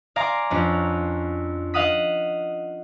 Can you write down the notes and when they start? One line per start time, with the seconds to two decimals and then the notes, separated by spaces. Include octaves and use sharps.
0.16 D5 F5 G#5 A#5 C6 D6
0.50 F2 C#4 D4
1.74 D#5 F5 F#5 D#6 B6